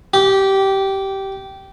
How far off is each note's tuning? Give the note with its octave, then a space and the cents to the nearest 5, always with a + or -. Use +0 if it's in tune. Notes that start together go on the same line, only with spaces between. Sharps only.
G4 -15